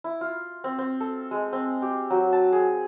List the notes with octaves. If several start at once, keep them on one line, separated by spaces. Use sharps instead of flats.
E4
F4
C4
C4
A4
G#3
C4
G4
F#3
A5
G#4